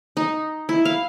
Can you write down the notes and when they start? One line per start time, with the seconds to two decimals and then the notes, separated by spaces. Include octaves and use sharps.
0.17 D#4
0.69 E4
0.85 F5